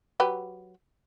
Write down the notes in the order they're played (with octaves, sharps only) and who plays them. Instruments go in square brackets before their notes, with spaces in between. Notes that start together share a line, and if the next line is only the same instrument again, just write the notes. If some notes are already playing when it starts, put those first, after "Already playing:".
[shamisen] F#3 G4 B4